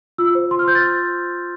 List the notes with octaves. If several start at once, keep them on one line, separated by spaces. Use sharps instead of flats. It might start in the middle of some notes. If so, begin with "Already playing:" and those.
F4 E6
C5
F4 C6
F6
C5 G6
A6